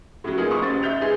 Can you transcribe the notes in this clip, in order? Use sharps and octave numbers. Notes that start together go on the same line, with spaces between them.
A2 C#3 F#3
A#3 B3 D#4 F4 G#4
F#1 C#6 D#6
A1 C#3 C5 A6
E5 G6 F7
G#3 D#4 G#4 B4